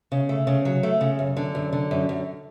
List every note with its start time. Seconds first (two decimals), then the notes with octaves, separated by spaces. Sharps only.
0.12 C#3
0.29 A3
0.47 C#3
0.65 F#3
0.83 A3
1.01 C#3
1.19 F#2
1.37 D3
1.55 F#2
1.73 D3
1.91 F#2
2.09 F#2